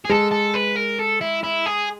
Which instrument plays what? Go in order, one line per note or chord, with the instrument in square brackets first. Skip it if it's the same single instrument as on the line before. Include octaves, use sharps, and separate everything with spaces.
[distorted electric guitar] G#4
[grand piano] G#3 [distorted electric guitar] A4
[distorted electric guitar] A4
B4
A#4
A4
E4
E4
G#4